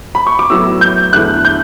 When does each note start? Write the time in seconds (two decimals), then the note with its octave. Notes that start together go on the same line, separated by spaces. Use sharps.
0.15 B5
0.27 C#6
0.39 D6
0.50 A2 F#3 B3 E4 E6
0.81 G6
1.13 E2 D3 A3 E4 F#6
1.45 G6